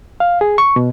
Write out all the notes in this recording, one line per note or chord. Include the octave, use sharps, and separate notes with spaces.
F5
G#4
C#6
B2